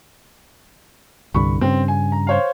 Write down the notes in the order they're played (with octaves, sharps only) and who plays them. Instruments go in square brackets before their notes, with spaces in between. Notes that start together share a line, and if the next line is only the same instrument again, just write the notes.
[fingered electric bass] C2 G2 D3 [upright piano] B5 C#6
[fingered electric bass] G2 C#3 [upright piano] C4
[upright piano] G#5
A#5
C5 C#5 F5